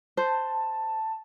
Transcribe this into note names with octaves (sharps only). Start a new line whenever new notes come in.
C5 A5